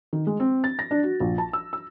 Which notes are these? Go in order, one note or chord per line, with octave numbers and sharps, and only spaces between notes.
D#3
G#3
C4
A6
A#6
D4
F#4
A#1
A5
E6
E6